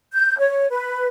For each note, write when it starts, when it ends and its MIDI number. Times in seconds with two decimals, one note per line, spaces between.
0.13 0.38 91
0.39 0.66 73
0.71 1.07 71